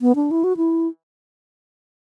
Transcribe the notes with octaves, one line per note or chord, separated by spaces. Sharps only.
B3
D4
E4
F#4
E4